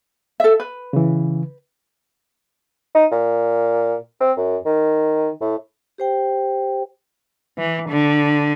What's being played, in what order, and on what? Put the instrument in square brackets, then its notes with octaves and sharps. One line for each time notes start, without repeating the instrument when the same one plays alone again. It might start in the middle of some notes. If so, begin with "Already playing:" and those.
[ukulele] A4 E5
B4
[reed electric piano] C#3 E3
[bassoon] D#4
A#2
C4
F#2
D#3
A2
[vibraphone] G4 C5 G5
[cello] E3
D3